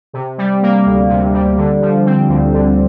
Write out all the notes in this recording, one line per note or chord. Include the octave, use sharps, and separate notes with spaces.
C3
G3
A#3
D2
C3
G3
D3
F3
C4
D2
D3